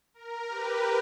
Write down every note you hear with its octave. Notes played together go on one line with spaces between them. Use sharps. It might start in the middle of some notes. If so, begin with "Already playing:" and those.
A#4
G4 B4